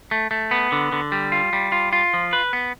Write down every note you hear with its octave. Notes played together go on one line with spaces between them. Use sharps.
A3
A3
B3
D3
D3
G3
F4
G3
F4
F4
F3
B4
B3